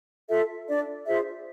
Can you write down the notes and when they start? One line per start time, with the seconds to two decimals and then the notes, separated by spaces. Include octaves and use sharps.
0.29 F4 A4 E5
0.68 D4 D5
1.06 F4 G#4 C5 E5